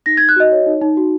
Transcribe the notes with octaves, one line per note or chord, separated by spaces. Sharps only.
D#4 A#6
G#6
D#4
F#6
F#4 D#5
C#5
D#4
D#4
F#4